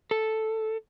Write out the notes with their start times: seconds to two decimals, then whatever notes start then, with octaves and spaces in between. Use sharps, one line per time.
0.11 A4